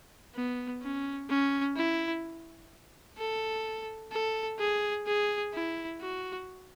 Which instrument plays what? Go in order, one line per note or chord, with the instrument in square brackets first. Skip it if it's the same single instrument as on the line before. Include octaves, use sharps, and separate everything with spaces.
[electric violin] B3
C#4
C#4
E4
A4
A4
G#4
G#4
E4
F#4